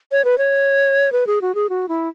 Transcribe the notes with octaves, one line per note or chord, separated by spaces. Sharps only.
C#5
B4
C#5
B4
G#4
F#4
G#4
F#4
E4